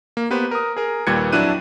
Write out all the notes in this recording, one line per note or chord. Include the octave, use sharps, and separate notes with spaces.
A#3
A#3 B3 G4 B4 C5
A#4 D#6
G#4 A#4
D#2 A#2 G3 B4 G#6 C#7
F2 F#3 D4 E4 F#6 D#7